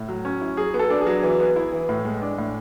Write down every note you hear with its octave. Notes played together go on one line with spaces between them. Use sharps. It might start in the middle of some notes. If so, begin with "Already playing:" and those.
Already playing: A2
F#3
C#4
E4
F#3 G#4
B3
A4
D4
G#4
F#3
E3
B3
E4
E3
A2
G#3
D4
A2